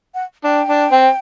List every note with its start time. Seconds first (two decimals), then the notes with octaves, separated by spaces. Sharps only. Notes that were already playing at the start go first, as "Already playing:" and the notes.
0.14 F#5
0.44 D4 G5
0.68 D4
0.92 C4